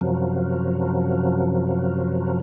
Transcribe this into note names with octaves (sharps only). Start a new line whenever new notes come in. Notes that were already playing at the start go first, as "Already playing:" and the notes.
F#2 C3 F3 F#3